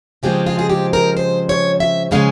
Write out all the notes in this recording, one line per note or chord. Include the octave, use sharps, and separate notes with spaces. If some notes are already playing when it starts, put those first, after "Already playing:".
C#3 F3 G#3 C4 G4
F4
G#4
G4
A#4
C5
C#5
E5
C#3 F3 G#3 C#4 F5